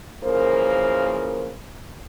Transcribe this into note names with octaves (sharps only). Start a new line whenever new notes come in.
C#3 E3 F3 A#3 A#4 C5